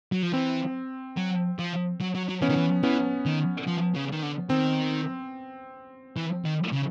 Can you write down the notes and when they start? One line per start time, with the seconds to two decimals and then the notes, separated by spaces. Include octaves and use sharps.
0.12 F#3
0.23 F3
0.33 E3 C4
1.17 F#3
1.59 F3
2.01 F#3
2.15 F#3
2.29 F#3
2.42 E3 B3 C#4
2.49 D#3
2.56 E3
2.83 E3 B3 C#4
3.26 D#3
3.67 F3
3.95 C#3
4.12 D#3
4.22 D3
4.50 D#3 C4
6.16 E3
6.45 D#3
6.72 C#3